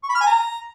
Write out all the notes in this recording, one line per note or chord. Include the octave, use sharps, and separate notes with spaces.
C#6
B5
F6
G#5
A#5